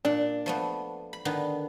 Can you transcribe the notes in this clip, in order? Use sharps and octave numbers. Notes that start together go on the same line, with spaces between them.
A#2 D4
F3 A3 B3
B5
D3 D#3 B3